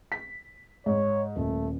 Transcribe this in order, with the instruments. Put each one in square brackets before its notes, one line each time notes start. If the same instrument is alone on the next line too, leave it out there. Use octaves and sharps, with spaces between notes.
[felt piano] B6
[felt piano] G#2 [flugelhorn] C#5
[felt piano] D#1 [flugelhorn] A3